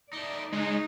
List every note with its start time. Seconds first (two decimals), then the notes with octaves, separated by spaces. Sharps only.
0.13 A3 D#4 D5
0.53 C#2 G#3 C#4 D#4